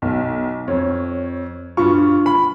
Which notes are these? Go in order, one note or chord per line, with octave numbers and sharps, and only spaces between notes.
B1
F2 C#5
G2 F4 C#6
B5